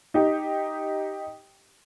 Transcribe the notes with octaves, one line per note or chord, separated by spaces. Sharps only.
D#4 G4